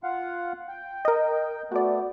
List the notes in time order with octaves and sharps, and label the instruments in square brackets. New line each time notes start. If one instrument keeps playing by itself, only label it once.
[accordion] F4 F5 F#5
G5
[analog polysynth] A#4 D#5
[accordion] A3 B3 [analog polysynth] F#4 D5